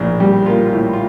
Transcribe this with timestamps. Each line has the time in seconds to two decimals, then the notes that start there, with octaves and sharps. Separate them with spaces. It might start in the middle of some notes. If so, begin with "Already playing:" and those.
Already playing: A#1 A2
0.20 G3 G4
0.46 A#3 F4
0.65 F4
0.72 A2 E4
0.93 F4